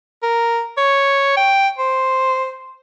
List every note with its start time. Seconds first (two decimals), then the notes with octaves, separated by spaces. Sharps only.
0.23 A#4
0.77 C#5
1.37 G5
1.78 C5